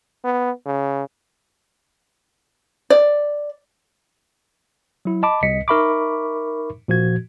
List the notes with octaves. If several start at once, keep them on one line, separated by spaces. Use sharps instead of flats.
B3
C#3
D5
F#3 E4
D#5 A5 B5 D6
C2 D#5 B6 C#7
D#4 A#4 E5 B5 C#6 D6
A#2 F3 F#4 G#6